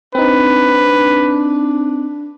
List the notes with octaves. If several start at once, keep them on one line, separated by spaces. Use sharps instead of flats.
C4 D4 D#4 B4